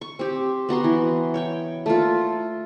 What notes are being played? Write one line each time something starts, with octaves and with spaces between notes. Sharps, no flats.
C#6
C4 G4
B3 F#4 A#5 C6
E3
C#5 G5 C#6
A3 A#3 F4